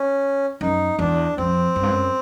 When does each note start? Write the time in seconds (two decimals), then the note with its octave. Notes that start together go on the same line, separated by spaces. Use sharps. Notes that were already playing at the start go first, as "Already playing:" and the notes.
Already playing: C#4
0.61 F#2 D#4
0.99 E2 D4
1.37 F2 C4
1.76 F#2
1.83 G2
1.91 F#2